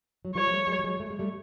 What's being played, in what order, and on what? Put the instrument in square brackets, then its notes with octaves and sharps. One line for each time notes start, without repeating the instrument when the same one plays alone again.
[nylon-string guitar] F#3
[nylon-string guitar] F3 G3 [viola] C#5
[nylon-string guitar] A#3
G3 A3
F#3 G#3
G3
F#3 G#3
A3
G#3
G3 A3